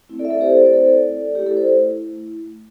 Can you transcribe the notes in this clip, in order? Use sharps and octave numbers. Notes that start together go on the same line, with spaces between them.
A3 C4 E4
A4 D5
E5
A4 D5
G4 C5
A4 D5
C5
A4 D5
A3 E4 G4
A4
C5